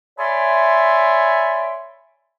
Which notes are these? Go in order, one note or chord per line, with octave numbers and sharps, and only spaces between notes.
C#5 D5 E5 G#5 B5 C6